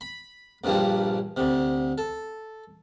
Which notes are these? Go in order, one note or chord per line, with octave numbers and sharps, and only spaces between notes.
B5
A#1 G2 A#2 F3 G3
D2 C3
A4